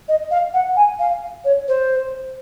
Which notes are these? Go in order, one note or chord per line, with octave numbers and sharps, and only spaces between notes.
D#5
F5
F#5
G#5
F5
C#5
C5